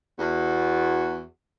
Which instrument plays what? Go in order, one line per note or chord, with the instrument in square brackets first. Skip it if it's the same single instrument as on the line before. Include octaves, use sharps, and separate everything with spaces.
[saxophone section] E2 F#4